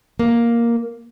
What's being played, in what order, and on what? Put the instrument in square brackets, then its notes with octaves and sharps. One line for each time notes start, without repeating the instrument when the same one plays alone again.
[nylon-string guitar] A#3